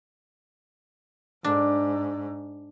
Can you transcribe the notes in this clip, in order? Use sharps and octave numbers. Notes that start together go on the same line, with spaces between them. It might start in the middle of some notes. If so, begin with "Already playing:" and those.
G#2 D4